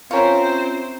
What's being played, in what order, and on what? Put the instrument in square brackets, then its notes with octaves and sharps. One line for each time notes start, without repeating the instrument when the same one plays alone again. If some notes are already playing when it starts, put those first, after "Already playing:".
[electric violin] C4 C5 [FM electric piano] C#4 F4 [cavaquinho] E4 A#4 C#5